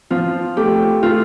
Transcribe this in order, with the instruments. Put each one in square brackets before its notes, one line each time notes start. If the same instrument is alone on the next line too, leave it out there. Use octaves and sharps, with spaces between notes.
[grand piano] F3 [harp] F4
[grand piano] A3 [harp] G4
[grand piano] A3 [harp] F4